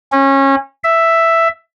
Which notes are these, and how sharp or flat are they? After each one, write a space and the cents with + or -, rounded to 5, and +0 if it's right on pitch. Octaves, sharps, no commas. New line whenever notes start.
C#4 -25
E5 +5